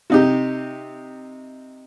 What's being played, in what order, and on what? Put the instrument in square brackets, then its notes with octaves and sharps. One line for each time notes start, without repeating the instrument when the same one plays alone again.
[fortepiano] C3 D#4 G4